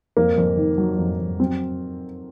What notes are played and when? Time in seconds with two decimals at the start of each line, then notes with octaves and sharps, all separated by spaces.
0.17 F2 A#3
0.38 F2
0.57 D#3
0.78 F#3
0.98 F2
1.19 F2
1.39 F#3 C4